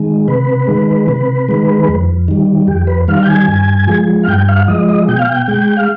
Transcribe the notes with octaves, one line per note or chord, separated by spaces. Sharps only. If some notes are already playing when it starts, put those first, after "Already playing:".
Already playing: D#3 G#3
C3 B4
D#3 G#3
C3
D#3 G#3
F2
D#3 G3
F2 G4
B4
D#3 G3 F5
G5
G#5
G2
F3 G#3
F5
G2 G5
F5
F3 G#3 D#5
D#5
B2 G5
F5
G5
G#3 G5
F5